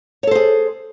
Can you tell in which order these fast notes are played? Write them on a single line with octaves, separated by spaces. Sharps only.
C#5 A4 C5 G#4